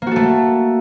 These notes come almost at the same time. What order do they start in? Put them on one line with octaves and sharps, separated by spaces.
A#3 F#4 A4 A3